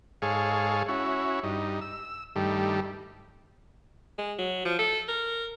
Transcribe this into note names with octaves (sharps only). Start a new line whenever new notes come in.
G#2 G#4 A4 C#5 F5
C#4 E4 F#4
G2 D#4
E6
G2 D#3 G3 A3
G#3
F#3
F3
A4
A#4